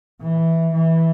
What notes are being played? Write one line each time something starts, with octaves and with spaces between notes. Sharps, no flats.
E3
E3